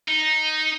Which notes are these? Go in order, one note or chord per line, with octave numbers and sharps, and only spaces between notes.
D#4